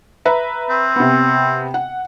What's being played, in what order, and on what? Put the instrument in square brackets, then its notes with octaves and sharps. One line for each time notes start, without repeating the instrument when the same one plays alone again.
[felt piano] B4 E5 A#5
[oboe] C4
[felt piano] C3 B3
F#5